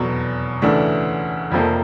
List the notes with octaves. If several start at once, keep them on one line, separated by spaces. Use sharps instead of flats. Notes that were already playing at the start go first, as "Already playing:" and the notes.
Already playing: F1 E2 B2 F#3
D2 C#3 E3 A3 D4
F1 F2 C3 F3 A#3